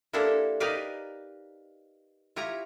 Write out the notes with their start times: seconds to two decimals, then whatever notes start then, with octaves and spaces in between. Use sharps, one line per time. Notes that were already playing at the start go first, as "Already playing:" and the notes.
0.13 A#3 D4 E4 G4 A4 C5
0.60 D#4 G4 A#4 B4 D5 F5
2.36 E4 F4 G4 C#5 A#5